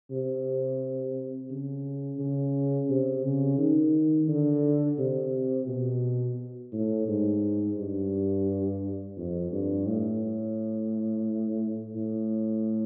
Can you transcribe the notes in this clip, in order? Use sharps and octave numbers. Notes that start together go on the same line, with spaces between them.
C3
C#3
C#3
C3
C#3
D#3
D3
C3
B2
A2
G#2
G2
F2
G2
A2
A2